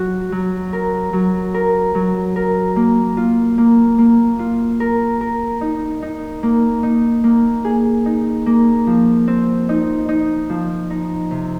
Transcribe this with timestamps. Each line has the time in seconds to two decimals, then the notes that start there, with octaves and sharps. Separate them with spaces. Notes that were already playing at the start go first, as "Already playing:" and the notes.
Already playing: F#3 F#4
0.32 F#3
0.73 A#4
1.13 F#3
1.54 A#4
1.95 F#3
2.36 A#4
2.76 A#3
3.17 F4
3.58 A#3
3.98 A#3
4.39 F4
4.80 A#4
5.21 A#4
5.61 D#4
6.02 D#4
6.43 A#3
6.83 D#4
7.24 A#3
7.65 G#4
8.06 D#4
8.46 A#3
8.87 F3
9.28 C4
9.69 D#4
10.09 D#4
10.50 F3
10.90 D#4
11.31 C3